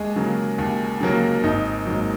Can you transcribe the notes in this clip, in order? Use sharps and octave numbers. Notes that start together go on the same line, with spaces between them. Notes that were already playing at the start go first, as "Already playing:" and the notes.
Already playing: D#2 G#3 G#4
C#3 F#3 A#3
D#2
C#3 F#3 A#3
G#1 D#4
G#2 D#3 F#3 A#3